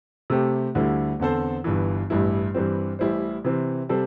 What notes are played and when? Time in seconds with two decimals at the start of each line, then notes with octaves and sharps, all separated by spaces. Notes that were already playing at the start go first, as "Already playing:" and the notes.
0.30 C3 A3 C4 G4
0.75 D2 D3 G3 E4
1.19 E2 D3 C4 A4 C5
1.64 G1 G2 E3
2.10 A1 G2 G3 E4
2.54 G2 E3 G3 C4
2.99 A1 A2 G3 E4 C5
3.44 C3 E3 C4
3.89 C3 G3 C4 A4 C5